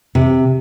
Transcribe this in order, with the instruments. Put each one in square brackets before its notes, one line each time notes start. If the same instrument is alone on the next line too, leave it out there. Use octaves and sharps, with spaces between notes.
[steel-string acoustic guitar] C3